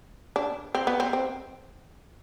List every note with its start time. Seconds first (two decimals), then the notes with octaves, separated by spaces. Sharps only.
0.36 D4
0.75 C4
0.87 B3
1.00 C4
1.13 C4